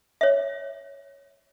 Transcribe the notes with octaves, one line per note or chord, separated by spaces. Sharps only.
C#5 E5